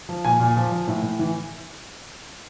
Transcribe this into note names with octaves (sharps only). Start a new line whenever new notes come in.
F3
A#2 G#5
A#2
F3
F3
A2
A2
E3